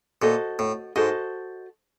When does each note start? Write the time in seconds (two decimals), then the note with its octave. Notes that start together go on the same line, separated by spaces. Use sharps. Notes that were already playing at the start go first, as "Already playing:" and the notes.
0.22 A#2 F#4 A4 C5 D#5
0.59 A2
0.96 G#2 F#4 A4 C5 D#5